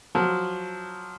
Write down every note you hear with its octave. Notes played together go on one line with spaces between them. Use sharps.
F3 F#3